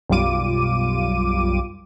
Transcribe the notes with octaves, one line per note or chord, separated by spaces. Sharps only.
B1 F#2 G3 F4 D6 D#7